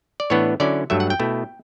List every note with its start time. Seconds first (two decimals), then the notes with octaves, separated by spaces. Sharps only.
0.20 D5
0.30 A2 E3 B3 D4 C#5
0.60 D3 F#3 C#4 E4 D5
0.90 G2 F#3 A3 E5
1.00 F#5
1.10 G5
1.20 B2 A3 E4